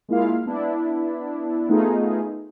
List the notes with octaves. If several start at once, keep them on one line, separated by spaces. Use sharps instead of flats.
G#3 A#3 E4 F4 F5
B3 D4 E4
A3 B3 D#4 F4 G#4